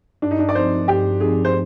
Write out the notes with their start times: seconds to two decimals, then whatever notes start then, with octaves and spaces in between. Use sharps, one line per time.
0.22 G2 D4
0.31 D#4
0.39 D4
0.49 D5
0.55 F3 C4 D#4 C5
0.88 G2 G4
1.20 F3 C4 D#4 G#4
1.45 C5